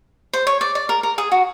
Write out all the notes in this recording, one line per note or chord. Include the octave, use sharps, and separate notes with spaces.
C5
C#5
D5
D5
A#4
A#4
G#4
F#4